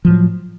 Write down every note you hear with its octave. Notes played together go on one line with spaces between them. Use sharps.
A2 F3 F#3